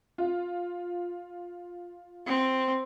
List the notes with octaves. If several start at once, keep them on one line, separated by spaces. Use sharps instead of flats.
F4
C4